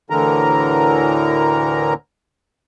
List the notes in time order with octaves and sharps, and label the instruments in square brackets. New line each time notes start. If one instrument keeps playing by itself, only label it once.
[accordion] D2 A2 D3 E3 A#4 A#5